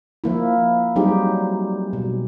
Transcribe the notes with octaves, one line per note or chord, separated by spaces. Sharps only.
F3 A#3 E4
F#3 G3 C4 D#4 G4 G#4
B2